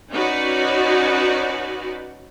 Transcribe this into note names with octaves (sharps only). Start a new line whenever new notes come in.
C#4 D#4 F#4 B4 C#5 D5